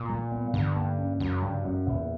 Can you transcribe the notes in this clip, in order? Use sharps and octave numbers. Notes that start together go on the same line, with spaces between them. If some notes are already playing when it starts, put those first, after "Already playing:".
Already playing: A#2
G3
B3
G2 D3
A#3
C#4
F#2 C#3
G2 F#3
F#2 C#4
E2 A#2